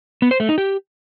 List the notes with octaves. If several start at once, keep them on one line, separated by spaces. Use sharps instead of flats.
B3
C5
A3
D#4
G4